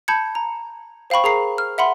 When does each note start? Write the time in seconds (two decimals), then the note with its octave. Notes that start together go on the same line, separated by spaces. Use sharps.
0.08 A5 B5 G6 G#6 C#7
0.35 A#5
1.10 C5 F5 G5 B5 C#6
1.24 G#4 A#4 A#5 C7
1.58 F6
1.78 E5 F#5 B5 C6